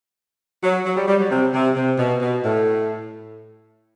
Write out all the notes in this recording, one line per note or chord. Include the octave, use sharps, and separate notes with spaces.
F#3
F#3
G3
G3
F#3
C3
C3
C3
B2
B2
A2